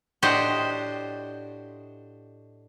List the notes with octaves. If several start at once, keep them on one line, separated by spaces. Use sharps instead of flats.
A2 D4 F#4 G4 C5 D#5